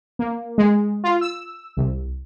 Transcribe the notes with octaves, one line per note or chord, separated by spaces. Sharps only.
A#3
G#3
F4
E6
C2